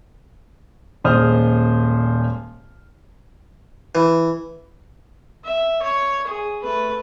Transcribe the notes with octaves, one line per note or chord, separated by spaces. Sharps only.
D#1 A#2 G#3 C5 D#6 F6
E3
E5
C#5
G#4
A3 B4